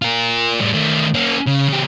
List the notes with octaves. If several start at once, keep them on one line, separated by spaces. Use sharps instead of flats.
F4 A#4
A2 G3
D#3 A3
A#3 C#4
C#3
C#3 G4